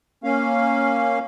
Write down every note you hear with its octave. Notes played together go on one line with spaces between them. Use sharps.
A#3 C#4 F5